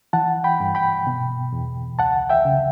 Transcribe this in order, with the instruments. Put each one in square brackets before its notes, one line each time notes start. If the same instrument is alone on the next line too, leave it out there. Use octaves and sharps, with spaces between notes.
[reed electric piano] E3 F#5 A5
G5 B5
G2
G5 B5
B2
E2
C#2 F#5 A5
E5 G5
C#3